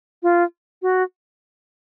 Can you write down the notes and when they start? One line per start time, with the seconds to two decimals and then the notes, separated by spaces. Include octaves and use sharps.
0.23 F4
0.82 F#4